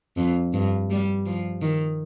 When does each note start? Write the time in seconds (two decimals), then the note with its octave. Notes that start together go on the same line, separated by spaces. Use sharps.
0.17 F2
0.54 G2
0.90 G3
1.26 F3
1.62 D#3